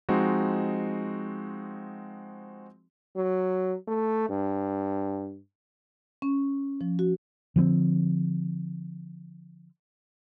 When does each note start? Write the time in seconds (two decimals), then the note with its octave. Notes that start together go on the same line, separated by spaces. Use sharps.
0.09 F3 G#3 C4 D#4 F#4
3.16 F#3
3.88 A3
4.29 G2
6.22 C#4
6.81 F3
6.99 F#4
7.56 D3 F3 A#3 C4